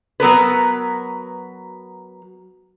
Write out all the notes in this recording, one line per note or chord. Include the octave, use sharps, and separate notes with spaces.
F#3 B3 A#4 B4